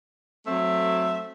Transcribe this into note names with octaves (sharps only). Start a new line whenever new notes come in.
F#3 A3 C4 E5